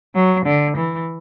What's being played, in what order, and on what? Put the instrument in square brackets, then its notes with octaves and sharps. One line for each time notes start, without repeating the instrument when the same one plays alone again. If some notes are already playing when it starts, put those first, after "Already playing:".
[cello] F#3
D3
E3